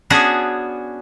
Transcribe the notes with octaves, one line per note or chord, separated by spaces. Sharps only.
B3 C#4 D4 F#4 G#4